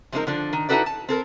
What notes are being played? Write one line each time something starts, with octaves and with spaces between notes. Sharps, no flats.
F3 G#3 C4 D4 D#4 A#4
D3 F3 D4
D#3
D#4 E4 F#4 A4 B4 D5
A5
C4 A4 A#4